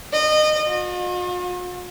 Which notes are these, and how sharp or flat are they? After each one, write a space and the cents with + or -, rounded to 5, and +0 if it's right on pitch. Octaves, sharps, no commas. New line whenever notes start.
D#5 -25
F4 +45